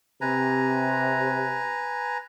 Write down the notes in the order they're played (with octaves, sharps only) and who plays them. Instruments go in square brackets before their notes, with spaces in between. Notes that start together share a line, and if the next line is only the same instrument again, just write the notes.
[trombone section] C3 [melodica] B4 G#5 A#5